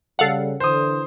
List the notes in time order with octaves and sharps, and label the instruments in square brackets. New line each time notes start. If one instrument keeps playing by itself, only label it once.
[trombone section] C#3 G3 [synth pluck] A4 F5 F#5
[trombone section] D3 E3 [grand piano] C5 D#6